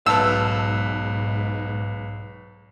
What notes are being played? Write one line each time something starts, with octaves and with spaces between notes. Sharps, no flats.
B1 G#2 B4 F5 A5 E6